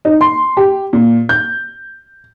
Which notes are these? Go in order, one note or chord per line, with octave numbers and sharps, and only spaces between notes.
D#4
C6
G4
A#2
G6